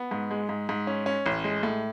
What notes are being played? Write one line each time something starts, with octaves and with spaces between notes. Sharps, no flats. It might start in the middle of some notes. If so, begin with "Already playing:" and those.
Already playing: B3
G#2
G#3
G#2
G#2
C#4
C#4
A1
G#3
A2